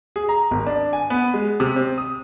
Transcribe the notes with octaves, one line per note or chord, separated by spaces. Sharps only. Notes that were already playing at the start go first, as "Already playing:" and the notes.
G#4
A#5
G#1
D4
G#5
B3
G#3
C3
C4
D#6